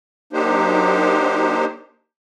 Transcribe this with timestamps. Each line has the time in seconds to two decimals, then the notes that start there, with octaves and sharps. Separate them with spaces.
0.33 F#3 A#3 D4 D#4 G4 C5